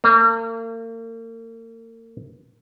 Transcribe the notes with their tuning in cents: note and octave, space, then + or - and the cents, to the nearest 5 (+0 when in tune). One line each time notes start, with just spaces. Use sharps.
A#3 -40